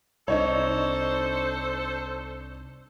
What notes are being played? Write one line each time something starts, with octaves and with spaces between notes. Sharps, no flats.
C2 D4 D#4 A4 C5 C#5